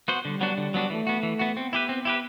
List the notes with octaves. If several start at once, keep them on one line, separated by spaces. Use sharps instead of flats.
B3 F#4 C5
D3 G3
F#3 B3 D4 F#4
D3
F#3 B3 D4 F#4
E3 A3
B3 F#4
E3
B3 F#4
B3 C4
E4 G4 B4
C4
E4 G4 B4